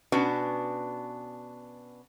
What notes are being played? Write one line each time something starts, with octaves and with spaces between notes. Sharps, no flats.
B2 B3 C#4 D4 F#4 B4